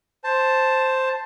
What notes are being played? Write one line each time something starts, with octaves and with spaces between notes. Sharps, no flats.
C5 A5